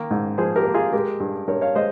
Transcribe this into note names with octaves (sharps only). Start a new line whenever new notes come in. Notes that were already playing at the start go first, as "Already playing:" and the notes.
Already playing: D#3 A#3
G#2
F3 G#4 C5
G4 A#4
A#3
F4 G#4
G#3 G4 A#4
G2
G2 A#4 C#5
C#5 F5
G#3 C5 D#5